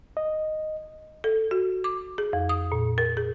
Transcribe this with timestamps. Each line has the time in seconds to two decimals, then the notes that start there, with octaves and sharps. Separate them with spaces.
0.17 D#5
1.24 A4
1.51 F#4
1.84 D6
2.18 G#4
2.33 F2
2.49 D#6
2.72 A#2
2.98 A#4
3.17 G#4